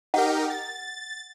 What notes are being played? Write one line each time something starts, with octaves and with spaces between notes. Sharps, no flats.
D#4 G4 A#4 F#5
A6